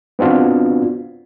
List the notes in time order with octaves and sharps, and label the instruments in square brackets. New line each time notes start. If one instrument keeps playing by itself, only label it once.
[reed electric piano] B3 C4 D4 F4 F#4